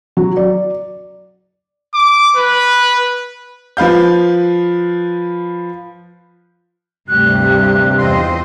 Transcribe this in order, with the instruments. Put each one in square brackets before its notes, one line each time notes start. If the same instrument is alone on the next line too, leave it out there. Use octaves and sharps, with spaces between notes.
[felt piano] F#3
D5
[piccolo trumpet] D6
B4
[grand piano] F3 B4 F5 G6
[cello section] D2 G3 G4 [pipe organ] G2 C3 [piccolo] F#6
[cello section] E2 C5 D#5 [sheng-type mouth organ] C4 F4 C6